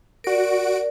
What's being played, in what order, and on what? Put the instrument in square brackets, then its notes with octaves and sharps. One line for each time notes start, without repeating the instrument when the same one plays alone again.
[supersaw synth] F#4 D7 [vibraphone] A#4 D5